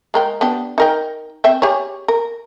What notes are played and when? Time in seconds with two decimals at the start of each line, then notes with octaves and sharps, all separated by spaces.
0.14 G#3 A#4 G5
0.41 B3 D4 G4
0.78 D#4 A#4 G5
1.44 C4 E5 G5
1.62 G4 G#4 C#5
2.08 A#4